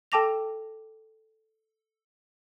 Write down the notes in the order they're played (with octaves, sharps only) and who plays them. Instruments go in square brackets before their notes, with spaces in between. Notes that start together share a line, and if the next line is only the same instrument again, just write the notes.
[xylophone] A4 G5 A5 D6 A#6 F7